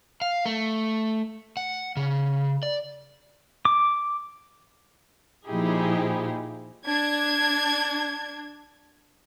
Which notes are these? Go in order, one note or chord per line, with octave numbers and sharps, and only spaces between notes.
F5
A3
F#5
C#3
D5
D6
A#2 F3 D#4 E4 G4 G#4
D4 G#6